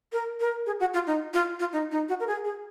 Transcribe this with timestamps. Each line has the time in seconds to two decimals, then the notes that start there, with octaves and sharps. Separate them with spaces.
0.12 A#4
0.40 A#4
0.66 G#4
0.80 F#4
0.94 F4
1.07 D#4
1.34 F4
1.60 F4
1.73 D#4
1.91 D#4
2.09 F#4
2.20 A#4
2.27 G#4
2.45 G#4